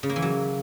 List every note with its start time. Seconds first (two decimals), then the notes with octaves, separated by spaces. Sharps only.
0.03 C#3
0.09 A#3
0.16 E3
0.22 F#3